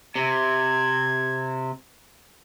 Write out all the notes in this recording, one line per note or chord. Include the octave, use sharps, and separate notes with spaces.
C3 G#6